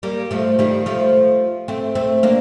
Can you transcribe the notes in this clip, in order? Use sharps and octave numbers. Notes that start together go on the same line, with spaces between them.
G3 A#3
F3 A3
D#3 G3
F3 A3
A3 C4
A3 C4
A#3 D4